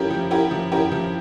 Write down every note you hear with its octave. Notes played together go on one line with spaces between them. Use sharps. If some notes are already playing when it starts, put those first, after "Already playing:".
Already playing: F3 C#4 E4 G4 A#4
F3
C#4 E4 G4 A#4
F3
C#4 E4 G4 A#4
F3